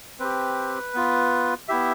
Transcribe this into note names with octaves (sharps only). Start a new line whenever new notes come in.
C4 G4 B4
B3 F4
B3 E4 G4 E5